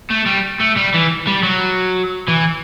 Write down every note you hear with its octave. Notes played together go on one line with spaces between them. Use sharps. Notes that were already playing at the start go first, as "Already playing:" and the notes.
A3
G3
A3
G3
E3
G3
F#3
E3